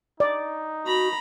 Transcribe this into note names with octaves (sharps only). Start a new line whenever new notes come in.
D#4 D5
F#4 A#5 B5